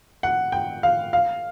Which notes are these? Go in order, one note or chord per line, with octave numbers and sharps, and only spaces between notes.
F#5
G5
F5
F5